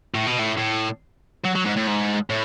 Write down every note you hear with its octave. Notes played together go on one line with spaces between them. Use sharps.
A2
B2
A2
A2
F#3
F#3
G#2
A2
G#2
A2